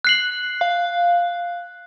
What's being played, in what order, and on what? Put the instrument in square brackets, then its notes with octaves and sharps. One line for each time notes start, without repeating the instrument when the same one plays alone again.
[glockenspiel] F#6 C7 F#7
[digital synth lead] F5